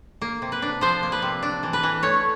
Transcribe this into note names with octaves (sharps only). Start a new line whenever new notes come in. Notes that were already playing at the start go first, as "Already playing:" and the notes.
A#3
C3
B4
D4
F3 C5
A#3
B4
C3
D4
E3
B4
E3
A3 C#5